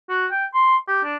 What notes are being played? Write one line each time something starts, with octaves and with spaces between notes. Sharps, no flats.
F#4
G5
C6
G4
D4